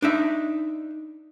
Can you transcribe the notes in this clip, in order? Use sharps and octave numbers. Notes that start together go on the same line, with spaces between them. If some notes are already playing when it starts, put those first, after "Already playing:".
D4 D#4 E5